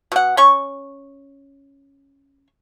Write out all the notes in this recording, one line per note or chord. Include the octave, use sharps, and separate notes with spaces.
B2 F#5
C#4 C#6